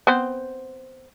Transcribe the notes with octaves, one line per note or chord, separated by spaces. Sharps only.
B3 C4 C5